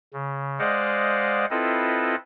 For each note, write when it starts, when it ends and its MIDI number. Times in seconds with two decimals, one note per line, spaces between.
0.14 0.59 49
0.59 1.45 56
0.59 1.45 72
0.59 1.45 74
0.59 1.45 75
0.59 1.45 77
0.59 1.45 78
1.50 2.15 60
1.50 2.15 64
1.50 2.15 65
1.50 2.15 69
1.50 2.15 71
1.50 2.15 75